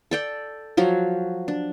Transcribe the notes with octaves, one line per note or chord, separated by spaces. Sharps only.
A4 D5 G5
F3 F#3 F#4
D4